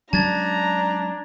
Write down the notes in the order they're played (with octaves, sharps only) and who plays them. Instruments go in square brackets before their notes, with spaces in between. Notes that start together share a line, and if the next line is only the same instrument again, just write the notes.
[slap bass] F#3 G#3 C#4 [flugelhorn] D4 [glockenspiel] A5 G#6 A6 [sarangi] A#5